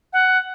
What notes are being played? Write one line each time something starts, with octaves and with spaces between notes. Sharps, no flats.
F#5